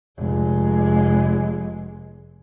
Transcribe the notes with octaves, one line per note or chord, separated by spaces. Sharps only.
F1 G#3